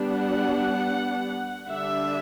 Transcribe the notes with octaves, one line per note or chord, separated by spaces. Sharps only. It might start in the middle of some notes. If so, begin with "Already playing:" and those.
Already playing: G3 B3 D4
F#5
D3 G3 D4 E5